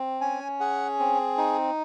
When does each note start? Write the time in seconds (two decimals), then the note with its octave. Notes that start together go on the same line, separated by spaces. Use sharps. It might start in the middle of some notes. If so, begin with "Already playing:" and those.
Already playing: C4
0.21 C#4 G#5
0.60 G#4 F#5
0.99 C4
1.37 D#4